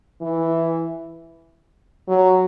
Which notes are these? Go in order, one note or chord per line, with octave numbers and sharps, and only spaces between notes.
E3
F#3